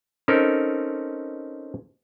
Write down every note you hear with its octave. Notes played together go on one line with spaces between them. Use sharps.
C4 C#4 D#4 A4 A#4